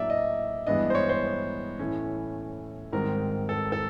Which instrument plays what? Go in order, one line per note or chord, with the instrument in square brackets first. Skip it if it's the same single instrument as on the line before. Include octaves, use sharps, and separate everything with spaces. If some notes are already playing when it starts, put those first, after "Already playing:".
Already playing: [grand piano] A2 F#3 A#3 D4 D5 E5
D#5
G2 E3 G#3 B3 D4 D#5
C5
C#5
C5
A2 E3 A3 C#4
G#2 D#3 G3 C4 A#4
A4
A4